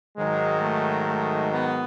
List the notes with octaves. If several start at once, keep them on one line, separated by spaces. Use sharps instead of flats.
G#2 D#3 F#3 G#3
A3
A3
B3